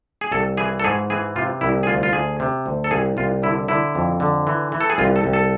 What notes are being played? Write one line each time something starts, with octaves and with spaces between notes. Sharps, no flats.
G#4
C2 A4
E3 G#4
A4
G#2 G#4
E3 G#4
C3 F4
C2 E4
G#4
D2 F4
F4
D2 G#4
C3
D2
A4
C2 G#4
C2 F4
D3 E4
D3 E4
F2
D3
E3
E3
A4
G#4
C2 F4
A4
C2
A4